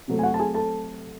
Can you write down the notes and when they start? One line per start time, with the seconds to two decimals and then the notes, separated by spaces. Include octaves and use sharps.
0.08 C3 F#3 A3
0.19 G#5
0.23 F#4 F#5
0.34 A5
0.39 G#4 G#5
0.55 A4 A5